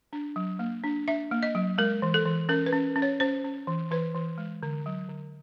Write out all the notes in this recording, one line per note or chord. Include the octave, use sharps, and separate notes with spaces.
D4
F#3
A#3
D4
D4 E5
A#3
D#5
F#3
G#3 A#4
E3
A4
E3
C#4 A#4
B4
C#4
C#4
C#5
C#4 C5
C#4
E3
E3 B4
E3
G#3
D3
F#3
D3